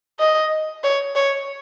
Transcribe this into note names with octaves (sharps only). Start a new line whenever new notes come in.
D#5
C#5
C#5